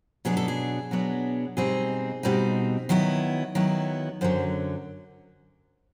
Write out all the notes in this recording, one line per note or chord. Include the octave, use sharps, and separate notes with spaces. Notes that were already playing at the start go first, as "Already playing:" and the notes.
B2 F#3 B3 D4 G#4
A4
G#4
B2 F#3 B3 D4
B2 G3 C4 D#4 G#4
B2 G3 C4 D#4
D#3 F#3 B3 E4
D#3 F#3 B3 E4
F#2 D3 F#3 C5